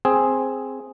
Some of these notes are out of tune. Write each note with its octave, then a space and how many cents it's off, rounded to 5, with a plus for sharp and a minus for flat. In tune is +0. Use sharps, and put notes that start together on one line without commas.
C4 +0 G#4 +0